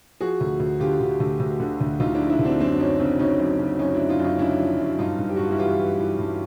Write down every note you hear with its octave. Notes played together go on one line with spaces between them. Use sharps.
F3 F#4 G#4
D2
D2
D3 F4 G4
D3
D2
D2
D3
D2
D2 D#4 F4
D4 E4
F3
D4 E4
D2
C4 D4
F#2 C4 D4
D4
F#2 C#4 D#4
C#3 C4 D4
C#3 C#4 D#4
F#2
C#3
F#2 C#4 D#4
F#2 D4 E4
D#4 F4
F#2
D#4 F4
C#3 D4 E4
F3
F#2
G2 D#4 F4
G2
G4
F#4
G2 F4
E4 F#4
E3 F4 G4
E3
E3
G2